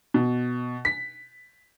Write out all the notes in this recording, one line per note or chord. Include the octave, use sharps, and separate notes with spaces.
B2
B6